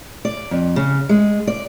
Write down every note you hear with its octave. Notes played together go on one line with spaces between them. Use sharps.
D5
F2
C#3
G#3
D5